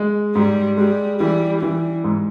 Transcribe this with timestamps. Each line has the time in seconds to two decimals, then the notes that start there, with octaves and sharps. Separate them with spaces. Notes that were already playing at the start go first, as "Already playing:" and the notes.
Already playing: G#3
0.35 G#2 G3
0.78 G3 G#3
1.20 E3 G3
1.62 E3 G3
2.04 G#2